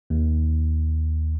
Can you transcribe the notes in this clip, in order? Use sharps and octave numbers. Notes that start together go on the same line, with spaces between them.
D#2